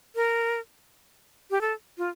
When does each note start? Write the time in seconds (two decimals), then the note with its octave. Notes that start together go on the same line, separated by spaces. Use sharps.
0.16 A#4
1.51 G4
1.61 A4
1.98 F4